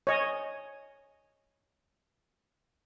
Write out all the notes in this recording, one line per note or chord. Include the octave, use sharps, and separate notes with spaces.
C#5 D#5 G#5